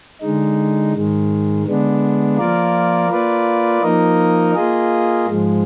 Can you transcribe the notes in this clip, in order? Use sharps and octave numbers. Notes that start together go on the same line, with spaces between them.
D3 G#3 D#4
G#2 D#3 G#3
D3 G#3 B3 D4
F3 A#3 F4 A#4 D5
A#3 F4 B4 D5
F3 A#3 D#4 A#4 D#5
A#3 F4 G#4 D#5
G#2 F3 G#3